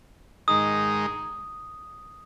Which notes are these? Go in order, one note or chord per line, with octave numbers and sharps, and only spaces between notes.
G#2 D#3 G#3 D#4 G#4 D#6